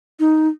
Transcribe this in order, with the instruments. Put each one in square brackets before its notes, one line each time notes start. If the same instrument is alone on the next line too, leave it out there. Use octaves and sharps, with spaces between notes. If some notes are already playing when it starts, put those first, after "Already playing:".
[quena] D#4